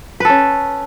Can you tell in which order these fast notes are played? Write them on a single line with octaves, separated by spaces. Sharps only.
B4 A4 C#4